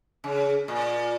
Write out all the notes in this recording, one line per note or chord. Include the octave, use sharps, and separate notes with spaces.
C#3
A#2